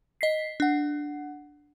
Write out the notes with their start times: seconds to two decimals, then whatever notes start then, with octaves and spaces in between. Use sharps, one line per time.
0.21 D#5 B6 C7
0.60 D4 F#5